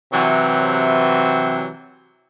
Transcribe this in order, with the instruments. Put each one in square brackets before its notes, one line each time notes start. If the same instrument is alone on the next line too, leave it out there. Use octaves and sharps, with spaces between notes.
[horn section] C3 E3 F#3